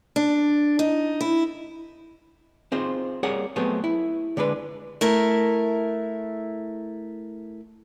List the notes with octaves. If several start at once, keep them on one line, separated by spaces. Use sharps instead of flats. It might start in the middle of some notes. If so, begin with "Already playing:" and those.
D4
D#4
E4
C4 D#4 F4 G#4 C5
G3 A#3 G#4 C#5 F#5
F#3 A3 B3 C4 G4 G#4
E4
D3 G#3 D4 B4
A3 E4 A#4 E5